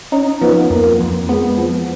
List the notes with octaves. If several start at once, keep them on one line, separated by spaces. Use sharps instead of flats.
C#4 D#4
F3 B3
F2 A#3
F2
G#3 B3
F3